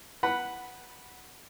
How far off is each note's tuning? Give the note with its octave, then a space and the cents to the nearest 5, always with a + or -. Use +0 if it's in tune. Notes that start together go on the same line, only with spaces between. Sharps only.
B4 -15 F#5 +0 B5 +0